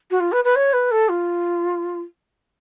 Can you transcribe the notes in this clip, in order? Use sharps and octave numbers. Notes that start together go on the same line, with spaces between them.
F#4
F4
B4
B4
C#5
B4
A4
F4